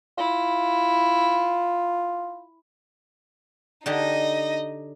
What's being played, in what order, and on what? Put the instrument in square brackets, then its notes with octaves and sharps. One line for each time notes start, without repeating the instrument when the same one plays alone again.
[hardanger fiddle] E4 [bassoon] F4
[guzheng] D3 G4 G#4 [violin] D#4 D#5